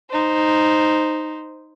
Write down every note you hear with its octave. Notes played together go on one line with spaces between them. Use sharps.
D#4 C5